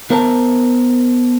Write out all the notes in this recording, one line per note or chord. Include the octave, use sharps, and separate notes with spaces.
B3 A#4 C5 A5 A#5